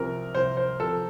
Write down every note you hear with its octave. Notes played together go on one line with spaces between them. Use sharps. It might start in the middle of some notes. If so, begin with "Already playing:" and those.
Already playing: C2 C3 F3 A#4
C2 C5
C5
C3 F3 A4